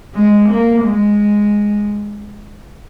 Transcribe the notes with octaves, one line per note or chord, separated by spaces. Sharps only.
G#3
A#3
G#3